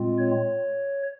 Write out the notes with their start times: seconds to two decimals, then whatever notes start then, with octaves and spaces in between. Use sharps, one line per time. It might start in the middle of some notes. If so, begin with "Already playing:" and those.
Already playing: A#2 G#3 C4 F4
0.18 C#5